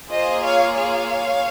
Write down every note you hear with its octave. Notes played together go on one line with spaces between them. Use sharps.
A#3 F4 G#4 C5 D#5
C#5 F5
C#5 F5